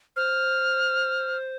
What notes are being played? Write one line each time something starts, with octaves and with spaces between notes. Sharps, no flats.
C5 F6